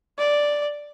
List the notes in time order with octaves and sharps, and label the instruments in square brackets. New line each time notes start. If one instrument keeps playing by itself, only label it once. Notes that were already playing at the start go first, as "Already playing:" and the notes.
[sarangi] D5